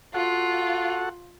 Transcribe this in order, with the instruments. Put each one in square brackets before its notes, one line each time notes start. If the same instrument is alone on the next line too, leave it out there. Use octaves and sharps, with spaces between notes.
[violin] F4 [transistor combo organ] F#4 A4 F#5